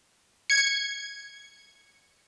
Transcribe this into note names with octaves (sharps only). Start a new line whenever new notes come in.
G#6 C#7